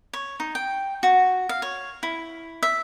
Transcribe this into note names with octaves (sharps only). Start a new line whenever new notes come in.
C#5
D#4
G5
F#4
F5
C#5
E4
E5